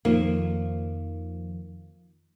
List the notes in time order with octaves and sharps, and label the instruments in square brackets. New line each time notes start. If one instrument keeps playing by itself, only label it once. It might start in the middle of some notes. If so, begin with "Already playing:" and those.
[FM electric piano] F2 D#3 F3 [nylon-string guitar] A#3